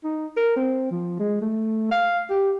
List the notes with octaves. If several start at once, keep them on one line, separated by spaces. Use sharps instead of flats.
D#4
A#4
C4
F3
G#3
A3
F5
G4